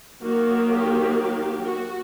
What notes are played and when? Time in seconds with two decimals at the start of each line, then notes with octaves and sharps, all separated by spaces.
0.22 D#3 F#3 A#3 F#4
0.69 G4
1.17 G4
1.65 F#4